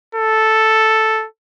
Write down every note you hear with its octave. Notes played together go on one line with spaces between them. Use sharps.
A4